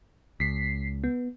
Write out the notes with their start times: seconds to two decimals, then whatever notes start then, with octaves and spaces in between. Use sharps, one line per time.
0.40 C#2 B6 C7
1.04 B3